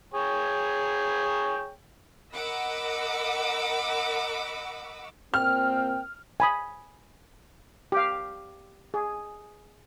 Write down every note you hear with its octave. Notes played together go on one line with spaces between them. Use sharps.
G#4 C#5 G5
A#4 D#5 F#5 B5 D6 E6
A#2 A#3 C4 G5 F6
G#5 B5 D#6
G4 F5
G#4